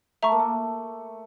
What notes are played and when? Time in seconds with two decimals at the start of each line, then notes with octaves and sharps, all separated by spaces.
0.23 A3 E5 A#5 C#6
0.32 A#3
0.39 A3